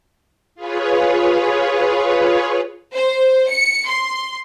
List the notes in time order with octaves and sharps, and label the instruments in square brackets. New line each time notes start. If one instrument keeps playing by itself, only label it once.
[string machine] F4 G#4 B4 C#5
[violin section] C5
C#7
C6